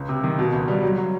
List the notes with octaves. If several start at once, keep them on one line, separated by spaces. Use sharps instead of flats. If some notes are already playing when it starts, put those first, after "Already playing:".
Already playing: C#2
C3
D#3
B2
C#2
G3
F#3
F#3